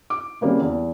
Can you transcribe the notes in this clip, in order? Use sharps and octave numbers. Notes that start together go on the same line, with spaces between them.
D6
C#3 G3 A#3 C4
E2